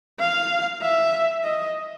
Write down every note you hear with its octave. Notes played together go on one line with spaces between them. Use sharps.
F5
E5
D#5